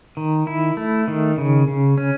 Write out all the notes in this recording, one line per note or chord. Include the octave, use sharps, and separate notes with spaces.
D#3
E4
A3
D#3
C#3
C#3
C#4